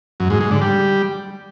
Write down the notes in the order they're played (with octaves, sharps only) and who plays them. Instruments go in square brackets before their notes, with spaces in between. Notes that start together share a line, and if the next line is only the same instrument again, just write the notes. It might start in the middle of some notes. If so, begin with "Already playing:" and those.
[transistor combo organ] F#2
G#2
G#2
D3
G3